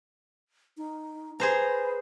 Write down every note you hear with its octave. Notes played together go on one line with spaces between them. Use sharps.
D#4
G#4 B4 C5 A#5